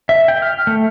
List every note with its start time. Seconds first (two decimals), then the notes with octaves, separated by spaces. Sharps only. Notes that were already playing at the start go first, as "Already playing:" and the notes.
0.09 E5
0.28 G5
0.42 F6
0.67 A3